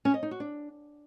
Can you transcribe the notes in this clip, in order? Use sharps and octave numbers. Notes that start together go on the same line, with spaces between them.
C#4
D#5
D#4
F#4
D4